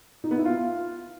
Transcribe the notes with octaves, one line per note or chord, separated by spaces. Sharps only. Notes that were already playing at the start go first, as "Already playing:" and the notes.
D#4
B3
E4
F4